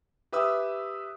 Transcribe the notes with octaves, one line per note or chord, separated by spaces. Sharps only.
G4 B4 E5 D#6 E6